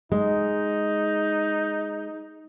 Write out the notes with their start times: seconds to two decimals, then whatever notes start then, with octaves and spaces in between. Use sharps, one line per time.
0.12 G#3 D#4